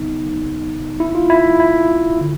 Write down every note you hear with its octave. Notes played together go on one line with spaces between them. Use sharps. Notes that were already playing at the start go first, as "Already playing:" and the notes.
Already playing: E2 C#3 F#3 B3 D#4
E4
F4
E4
E4
D3